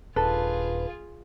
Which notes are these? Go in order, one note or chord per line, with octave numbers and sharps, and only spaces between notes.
D#1 D4 F4 G#4 A4 B4